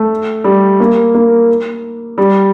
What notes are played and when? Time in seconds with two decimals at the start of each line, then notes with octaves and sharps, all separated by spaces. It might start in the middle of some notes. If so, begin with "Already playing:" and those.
Already playing: A3
0.44 G3
0.80 A#3
1.15 A#3
2.18 G3